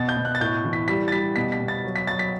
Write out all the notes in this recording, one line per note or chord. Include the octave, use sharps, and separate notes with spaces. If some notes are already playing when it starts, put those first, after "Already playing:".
Already playing: B2 A6
G6
B2
F#6
A6
A2 G6
E3
B6
G3 B6
A6
G3 B6
B2 B6
B6
B2
A6
F#3
B6
F#3 A6
B6